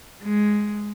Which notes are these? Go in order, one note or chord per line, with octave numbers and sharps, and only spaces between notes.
G#3